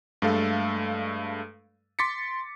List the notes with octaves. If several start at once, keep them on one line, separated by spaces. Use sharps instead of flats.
G2 G#3 A3 A4 F5
C6 D6 A6 B6 C#7